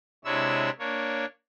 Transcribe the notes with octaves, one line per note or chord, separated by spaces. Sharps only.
C3 G#3 D4 E4 C#5 E6
A#3 D4 C#5